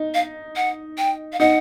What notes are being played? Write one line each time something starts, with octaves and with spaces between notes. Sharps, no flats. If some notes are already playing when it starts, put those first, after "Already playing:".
Already playing: D#4
F5
F#5
G5
F5
D#4 F#5